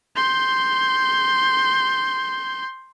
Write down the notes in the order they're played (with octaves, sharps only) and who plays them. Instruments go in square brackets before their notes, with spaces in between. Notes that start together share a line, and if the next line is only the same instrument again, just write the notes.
[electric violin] C6 G6